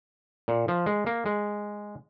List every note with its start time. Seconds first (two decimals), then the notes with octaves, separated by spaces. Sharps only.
0.48 A#2
0.68 F3
0.86 G#3
1.06 A#3
1.26 G#3